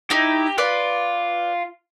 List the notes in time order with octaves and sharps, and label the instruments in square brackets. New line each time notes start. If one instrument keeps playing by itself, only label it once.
[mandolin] D#4 E4 [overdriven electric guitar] G4
[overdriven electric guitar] F4 [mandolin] B4 D5